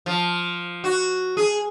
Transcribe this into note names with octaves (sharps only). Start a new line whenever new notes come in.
F3
F#4
G#4